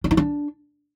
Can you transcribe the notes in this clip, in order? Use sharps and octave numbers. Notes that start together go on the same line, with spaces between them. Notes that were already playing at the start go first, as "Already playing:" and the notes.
D4
D#4
D4